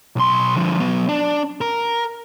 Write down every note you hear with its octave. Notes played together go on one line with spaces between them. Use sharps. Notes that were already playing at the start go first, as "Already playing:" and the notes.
B1 C6
D3 F3
F#3 B3
D4
A#4